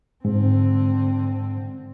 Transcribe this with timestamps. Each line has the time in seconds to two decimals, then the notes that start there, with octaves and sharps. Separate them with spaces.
0.25 G#2 D3 C4